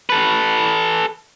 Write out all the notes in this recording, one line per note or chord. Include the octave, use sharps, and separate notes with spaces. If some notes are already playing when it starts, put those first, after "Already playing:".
A4 B4